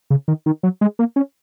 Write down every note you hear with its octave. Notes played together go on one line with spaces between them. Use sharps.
C#3
D#3
D#3
F#3
G#3
A#3
C#4